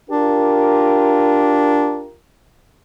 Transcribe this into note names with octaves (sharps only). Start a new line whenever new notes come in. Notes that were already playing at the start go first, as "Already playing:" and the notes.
D4 F4 G4 A#4